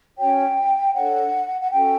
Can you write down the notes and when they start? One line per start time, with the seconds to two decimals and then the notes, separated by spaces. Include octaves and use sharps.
0.17 C#4 F#4 C#5 G5
0.94 D4 A4 C#5 F#5
1.61 F#5
1.71 C#4 F#4 A4 G5